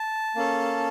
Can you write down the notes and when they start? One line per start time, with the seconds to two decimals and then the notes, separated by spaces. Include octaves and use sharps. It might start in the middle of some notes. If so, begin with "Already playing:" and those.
Already playing: A5
0.36 A#3 C#4 A4